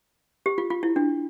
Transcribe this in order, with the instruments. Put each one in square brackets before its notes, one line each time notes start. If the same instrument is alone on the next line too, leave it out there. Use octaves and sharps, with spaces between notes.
[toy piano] G4
F4
F4
E4
D4